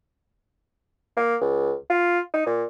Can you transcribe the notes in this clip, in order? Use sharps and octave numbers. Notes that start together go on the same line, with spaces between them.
A#3
C#2
F4
D#4
A#2